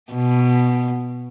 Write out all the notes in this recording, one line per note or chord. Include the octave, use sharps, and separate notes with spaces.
B2